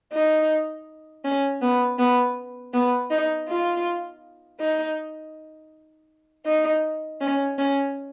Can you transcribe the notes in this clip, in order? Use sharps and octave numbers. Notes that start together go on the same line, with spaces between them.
D#4
C#4
B3
B3
B3
D#4
F4
D#4
D#4
C#4
C#4